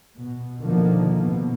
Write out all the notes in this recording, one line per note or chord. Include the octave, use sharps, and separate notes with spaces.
B2
B2 D3 D#3 F3 A#3
B2